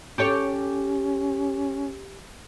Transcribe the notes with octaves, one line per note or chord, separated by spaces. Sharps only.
C#4 G4 A4 C#5